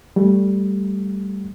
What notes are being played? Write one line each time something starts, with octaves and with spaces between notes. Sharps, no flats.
G3 A3